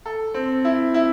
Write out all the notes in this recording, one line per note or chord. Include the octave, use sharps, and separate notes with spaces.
A4
C4
E4
E4